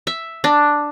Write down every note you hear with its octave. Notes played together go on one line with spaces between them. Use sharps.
E5
D4